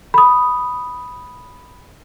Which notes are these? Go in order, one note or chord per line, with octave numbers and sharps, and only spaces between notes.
B5 D#6